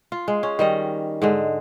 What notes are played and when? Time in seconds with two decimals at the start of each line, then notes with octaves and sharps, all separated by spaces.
0.12 F4
0.28 G#3
0.43 C#4
0.59 D#3 G3 D#5
1.22 G#2 D3 G#3